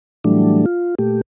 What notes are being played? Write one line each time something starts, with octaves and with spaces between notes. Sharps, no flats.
A2 E3 F#3 G3 A3 D4
F4
A#2 A3 G4